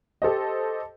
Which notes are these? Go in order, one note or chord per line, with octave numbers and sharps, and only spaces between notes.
G4 A4 C5 D#5